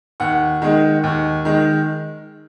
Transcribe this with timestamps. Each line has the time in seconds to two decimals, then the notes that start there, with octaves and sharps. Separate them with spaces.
0.20 D#2 F#5
0.62 D#3 G#3
1.03 D#2
1.45 D#3 G#3